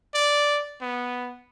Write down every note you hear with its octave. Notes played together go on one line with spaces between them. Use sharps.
D5
B3